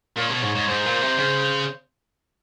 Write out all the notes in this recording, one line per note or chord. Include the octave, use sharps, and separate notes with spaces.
A#2 C#5
B2 C#5
G#2 C#5
G#2 C#5
G#2 C5
A#2
C3
C#3